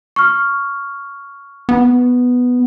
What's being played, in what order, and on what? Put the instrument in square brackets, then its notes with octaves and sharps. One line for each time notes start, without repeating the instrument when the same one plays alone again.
[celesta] C#6 F6
[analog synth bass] B3